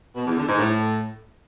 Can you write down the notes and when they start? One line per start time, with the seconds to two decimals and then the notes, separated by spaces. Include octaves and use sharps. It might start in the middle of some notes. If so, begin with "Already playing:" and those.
0.15 B2
0.26 E2
0.37 D3
0.47 G#2
0.58 A2